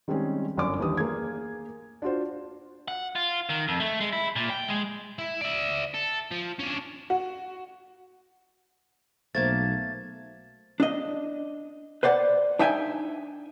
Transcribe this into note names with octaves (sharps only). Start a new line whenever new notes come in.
D#3 G3 G#3 C4 C#4 G#4
G1 F#2 D5 D6
D#2 E3 D4 G4 D#6
A#3 G#4 G#6
D4 F4 F#4 C5
F#5
F4
D#3
F2
A3
G#3
E4
A#2
G5
G#3
E4
D5 E5
A4
F3
C#4 D4
F#4
B1 A3 A#3 C5 A5 G#6 A6
D4 D#5
B4 C5 D5 F#5
D4 D#4 E5 G5 G#5